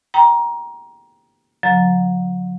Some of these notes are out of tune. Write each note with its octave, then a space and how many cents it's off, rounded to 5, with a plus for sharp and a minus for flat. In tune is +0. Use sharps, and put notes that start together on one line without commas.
G5 +0 A#5 +20
D3 -40 F#3 -40 A#5 +0